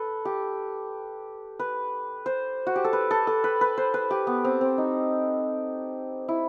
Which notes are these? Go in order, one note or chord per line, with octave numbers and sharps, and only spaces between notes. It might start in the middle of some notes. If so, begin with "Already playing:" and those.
Already playing: A4 B4
G4
B4
C5
F#4
G4
A4
B4
A4
A4
B4
B4
C5
B4
G4
B3
C4
C4
D#4
E4